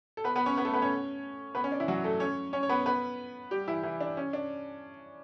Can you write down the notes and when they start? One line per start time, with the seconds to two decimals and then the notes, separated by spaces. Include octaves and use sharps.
0.17 A4
0.24 B3 B4
0.36 B3 B4
0.46 C#4 C#5
0.57 B3 B4
0.65 A3 A4
0.73 B3 B4
0.82 C#4 C#5
1.55 B3 B4
1.64 C#4
1.72 D4
1.80 E3 E4
1.88 F#3 F#4
2.04 A3 A4
2.20 C#4 C#5
2.53 C#4 C#5
2.63 C#5
2.69 B3 B4
2.86 B3 B4
3.51 G3 G4
3.67 E3 E4
3.83 E3 E4
4.00 D4
4.17 C#4
4.33 D4